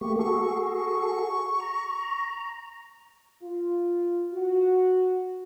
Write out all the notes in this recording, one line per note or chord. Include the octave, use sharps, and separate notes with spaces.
A3 A#3 G4 C#6
F#4 G#4 A4 C#6
C#6
A#5
F4
F#4